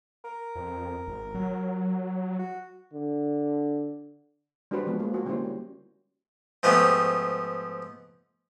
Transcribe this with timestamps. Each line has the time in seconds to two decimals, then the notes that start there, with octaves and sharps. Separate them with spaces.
0.25 A#4
0.55 F2
1.07 G#1
1.35 F#3
2.39 F#4
2.93 D3
4.71 G3 D4 F#4 B4 C5
4.87 F3 G#3 B3
4.99 G#3 A#3
5.13 F4 F#4 C5
5.25 D3 G3 A#3 C#4 E4 C5
5.44 G3
6.63 G#2 F3 A3 B3 C#4 G4